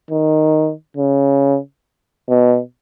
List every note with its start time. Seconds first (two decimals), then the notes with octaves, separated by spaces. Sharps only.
0.11 D#3
0.97 C#3
2.29 B2